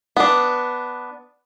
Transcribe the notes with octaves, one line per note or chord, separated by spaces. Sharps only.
B3 D4